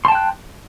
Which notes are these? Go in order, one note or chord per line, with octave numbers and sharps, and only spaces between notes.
G5 A5 C6 F#6